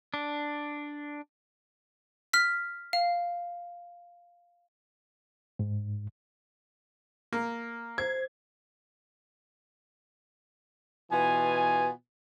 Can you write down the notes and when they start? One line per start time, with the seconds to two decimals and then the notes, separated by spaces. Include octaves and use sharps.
0.14 D4
2.33 F6 B6
2.93 F5
5.59 G#2
7.33 A#3
7.98 C5 G#6
11.10 B2 E3 B3 F4 G#5